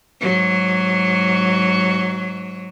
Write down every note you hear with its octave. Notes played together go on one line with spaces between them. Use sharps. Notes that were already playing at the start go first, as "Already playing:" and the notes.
G#2 F#3